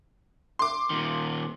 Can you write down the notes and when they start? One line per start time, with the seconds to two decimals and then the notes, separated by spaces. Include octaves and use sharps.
0.59 C6 D6
0.90 A#2 D#3